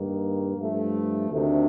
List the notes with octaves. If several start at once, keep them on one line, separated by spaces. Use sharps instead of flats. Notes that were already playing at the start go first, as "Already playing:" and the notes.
Already playing: G2 D#3 A#3
G2 F3 A3
D2 C3 D#3 A3 D4